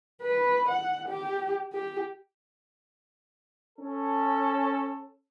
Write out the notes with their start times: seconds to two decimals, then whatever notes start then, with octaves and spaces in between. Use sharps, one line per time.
0.22 B4
0.69 F#5
1.09 G4
1.73 G4
3.79 C#4 A4